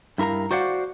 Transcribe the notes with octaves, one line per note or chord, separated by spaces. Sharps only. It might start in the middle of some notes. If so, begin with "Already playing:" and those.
G2 E4 A#4 F5 A#5
F#4 C5 D5 F5 F#5